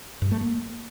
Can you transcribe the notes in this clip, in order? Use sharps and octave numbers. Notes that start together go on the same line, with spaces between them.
G2
A3
A#3